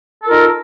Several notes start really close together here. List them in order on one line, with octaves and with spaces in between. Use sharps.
A4 F4 A#4 D#4